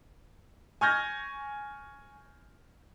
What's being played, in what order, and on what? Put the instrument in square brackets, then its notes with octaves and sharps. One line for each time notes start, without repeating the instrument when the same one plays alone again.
[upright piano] G#5 C#6 F6 G6 G#6 A#6